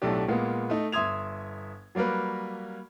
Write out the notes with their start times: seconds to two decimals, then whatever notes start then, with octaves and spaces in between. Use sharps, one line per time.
0.02 B1 A2 A3 D4 G4
0.28 A#2 G#3 A#3 B3
0.70 A3 D#4
0.92 G1 E5 C6 D#6 G#6 F7
1.95 F#3 G3 A#3 A#4 B4